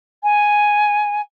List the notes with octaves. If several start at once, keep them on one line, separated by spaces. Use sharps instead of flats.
G#5